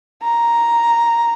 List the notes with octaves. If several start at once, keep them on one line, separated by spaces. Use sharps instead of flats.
A#5